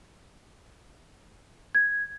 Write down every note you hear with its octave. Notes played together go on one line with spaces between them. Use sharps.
G#6